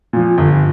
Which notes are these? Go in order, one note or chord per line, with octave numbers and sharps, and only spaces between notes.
A#2 F3
G1